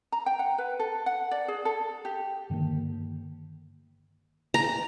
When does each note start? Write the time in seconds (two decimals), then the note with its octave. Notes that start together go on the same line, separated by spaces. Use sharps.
0.12 A#5
0.26 G5
0.39 F#5
0.58 B4
0.80 A4
1.06 F#5
1.31 D5
1.48 G#4
1.65 A4
2.05 G4
2.50 G2 D3 D#3 A#3
4.54 A#5